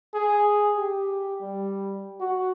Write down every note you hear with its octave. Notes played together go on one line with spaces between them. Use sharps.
G#4
G4
G3
F#4